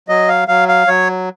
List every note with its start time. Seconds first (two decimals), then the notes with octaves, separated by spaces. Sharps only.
0.09 F#3 D#5
0.28 F5
0.48 F#3 F5
0.68 F5
0.87 F#3 C#5